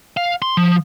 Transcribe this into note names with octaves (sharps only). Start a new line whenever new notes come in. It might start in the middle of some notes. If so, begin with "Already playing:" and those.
F5
C6
F3